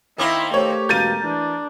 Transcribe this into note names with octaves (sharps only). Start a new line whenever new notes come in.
D#3 A#3 C4 E4 E5 G5 D6 D#6
A3 G4 A#4 C5 C#5
E1 B2 A#4 F5 G6 A6 D#7
E3 D4